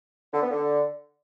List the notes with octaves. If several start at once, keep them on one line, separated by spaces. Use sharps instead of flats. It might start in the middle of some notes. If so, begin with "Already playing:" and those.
D3
B3
D3